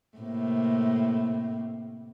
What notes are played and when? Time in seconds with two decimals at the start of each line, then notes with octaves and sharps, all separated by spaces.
0.18 A2 C3 A#3